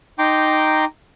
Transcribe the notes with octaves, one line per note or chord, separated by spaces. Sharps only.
D#4 G5 A#5 C6 D6 G6